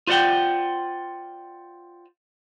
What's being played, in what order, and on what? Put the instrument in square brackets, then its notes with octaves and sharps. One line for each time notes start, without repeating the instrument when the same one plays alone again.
[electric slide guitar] F4 C5 D5 F#5 G5